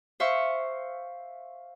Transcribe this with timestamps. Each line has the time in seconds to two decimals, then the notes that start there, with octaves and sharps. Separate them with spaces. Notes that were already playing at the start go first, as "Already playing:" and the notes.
0.20 C5 E5 F5 C#6